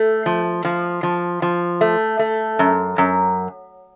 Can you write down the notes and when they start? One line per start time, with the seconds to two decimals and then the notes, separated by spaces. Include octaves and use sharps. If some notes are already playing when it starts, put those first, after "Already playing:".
Already playing: A3
0.26 F3
0.65 F3
1.03 F3
1.42 F3
1.81 A3
2.19 A3
2.59 F#2
2.98 F#2